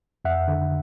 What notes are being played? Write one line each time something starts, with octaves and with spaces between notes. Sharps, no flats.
F2 E5 F#5
D3